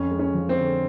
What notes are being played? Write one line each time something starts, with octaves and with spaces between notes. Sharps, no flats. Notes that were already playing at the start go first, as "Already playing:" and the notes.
Already playing: F2 C#4
G#3
C#4
F3
C4
D3